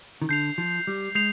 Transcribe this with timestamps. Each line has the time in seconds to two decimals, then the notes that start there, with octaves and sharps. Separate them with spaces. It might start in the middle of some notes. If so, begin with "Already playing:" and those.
0.22 D#3
0.29 D3 G6 C7 F7
0.58 F3
0.87 G3
1.15 G#3 G6 C7 F7